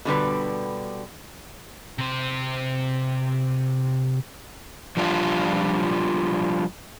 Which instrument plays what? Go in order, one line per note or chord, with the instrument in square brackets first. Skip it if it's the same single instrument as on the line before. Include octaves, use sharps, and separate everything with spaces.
[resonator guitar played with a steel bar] B2 D3 G3 B4
[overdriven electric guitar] C3 C5
[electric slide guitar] F3 G3 D4 F4